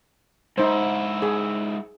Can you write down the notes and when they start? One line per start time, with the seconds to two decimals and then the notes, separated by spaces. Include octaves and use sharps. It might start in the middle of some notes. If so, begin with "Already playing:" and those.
0.58 G#2 D#4 E4 C5
1.22 G#4